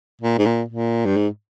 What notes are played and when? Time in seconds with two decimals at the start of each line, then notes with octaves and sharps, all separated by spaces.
0.22 A#2
0.38 G#2
0.46 A#2
0.69 A#2
1.06 G2
1.17 G#2